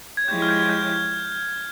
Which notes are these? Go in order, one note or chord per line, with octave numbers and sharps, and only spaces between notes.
G#6
F3 G#3 E4 G4 C#5 G6
F6
G6
G6